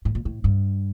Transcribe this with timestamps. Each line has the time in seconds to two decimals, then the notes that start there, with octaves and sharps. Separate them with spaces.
0.05 A2
0.15 A#2
0.25 A2
0.44 G2